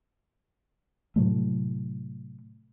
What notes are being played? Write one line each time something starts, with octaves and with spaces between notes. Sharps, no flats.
A2 C3 F#3 A3